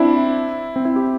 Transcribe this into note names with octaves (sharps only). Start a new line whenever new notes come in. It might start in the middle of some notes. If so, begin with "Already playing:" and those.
Already playing: C4 D4 E4
C4
E4
G4